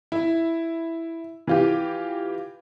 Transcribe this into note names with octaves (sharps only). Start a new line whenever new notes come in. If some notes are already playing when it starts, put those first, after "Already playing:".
E4
E3 F4 G4